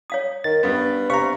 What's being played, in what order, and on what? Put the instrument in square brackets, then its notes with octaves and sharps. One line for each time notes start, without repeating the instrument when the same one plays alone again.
[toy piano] C#5 F5 D#6
[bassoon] D#3 [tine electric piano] A6
[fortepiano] G2 B3 [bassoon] B4
[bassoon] C3 [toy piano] B4 C5 F5 [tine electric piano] A#5 C#6